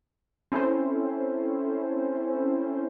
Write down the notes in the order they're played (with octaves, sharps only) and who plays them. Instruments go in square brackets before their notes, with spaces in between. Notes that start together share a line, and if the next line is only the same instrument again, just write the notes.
[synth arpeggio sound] C4 C#4 E4 A4 C5